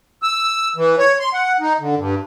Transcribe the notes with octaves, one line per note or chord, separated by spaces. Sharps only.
E6
E3
C#5
C6
F#5
D#4
D3
G2